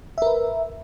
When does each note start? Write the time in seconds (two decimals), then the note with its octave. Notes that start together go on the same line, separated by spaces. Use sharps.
0.18 E5
0.22 A#4
0.26 B4